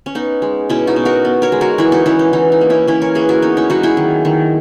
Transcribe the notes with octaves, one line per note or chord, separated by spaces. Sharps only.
C#4
B3 D#4
G#3
B2 C#4 E4
D#4 F#4
B2
F#4 A#4
B3
A#4 C#5
G#3
F#4 A#4
E3 E4 G#4
D#4 F#4
E3 C#4 E4
D#4
E3 D#4
D#4
A#3
C#4 E4
E3 C#4 E4
A#4 C#5
A#3 G#4 B4
F#4 A#4
B3 D#4
C#4 E4
F#3 D#4 F#4
E4 G#4
D#3
D#3